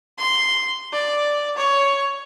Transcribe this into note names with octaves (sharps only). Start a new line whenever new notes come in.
C6
D5
C#5